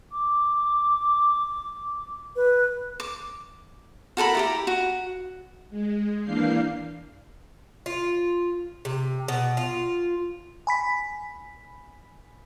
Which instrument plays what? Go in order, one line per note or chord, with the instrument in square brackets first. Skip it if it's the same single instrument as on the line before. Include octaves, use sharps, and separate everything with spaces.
[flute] D6
B4
[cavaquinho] D6
F#4 A4 A#4 B5
E4 G4 A#5
F#4
[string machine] G#3
E3 A#3 D4 F5 G6 C7
[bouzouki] F4
C3
B2
F4
[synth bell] G#5 B5 B6